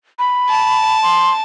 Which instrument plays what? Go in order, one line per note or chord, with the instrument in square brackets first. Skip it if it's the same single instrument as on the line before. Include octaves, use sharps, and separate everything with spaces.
[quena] B5
[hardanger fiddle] A5
[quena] C6